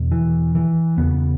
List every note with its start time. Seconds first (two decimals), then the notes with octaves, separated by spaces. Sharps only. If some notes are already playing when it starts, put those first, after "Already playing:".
Already playing: E2 B2
0.12 E3
0.55 E3
0.98 E2 C#3 B3